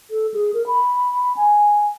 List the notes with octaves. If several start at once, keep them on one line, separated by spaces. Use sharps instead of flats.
A4
G#4
A#4
B5
G#5